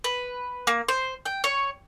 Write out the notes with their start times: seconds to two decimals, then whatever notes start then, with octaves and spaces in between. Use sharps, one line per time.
0.04 B4
0.67 A#3
0.88 C5
1.25 G5
1.44 C#5